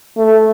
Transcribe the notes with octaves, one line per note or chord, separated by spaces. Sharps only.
A3